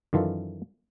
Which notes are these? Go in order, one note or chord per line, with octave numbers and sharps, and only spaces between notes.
F#2 D#3 E3 F4 A4